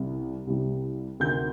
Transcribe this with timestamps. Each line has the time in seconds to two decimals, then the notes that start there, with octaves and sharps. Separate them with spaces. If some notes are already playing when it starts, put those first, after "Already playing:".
Already playing: C2 C3 G3
0.47 C2 C3 G3
1.20 D2 C3 D#3 G6